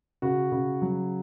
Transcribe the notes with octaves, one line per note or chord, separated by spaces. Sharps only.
C#3 F#4
C#3
F#3